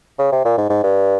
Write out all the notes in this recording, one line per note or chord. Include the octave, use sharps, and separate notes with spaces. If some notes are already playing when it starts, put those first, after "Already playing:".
C#3
C3
A#2
G#2
G#2
G2